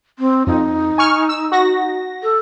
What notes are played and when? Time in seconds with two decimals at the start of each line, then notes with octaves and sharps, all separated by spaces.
0.19 C4
0.47 F2 D#4
0.98 G#5 C#6 F6
1.29 E6
1.52 F#4 A#6
2.23 A4